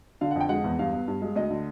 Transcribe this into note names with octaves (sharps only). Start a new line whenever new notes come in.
D3 F5
F#5
F2 G5
G#3 F#5
E2
G2 F5
B3
G2
G#3
D2 D#5
D3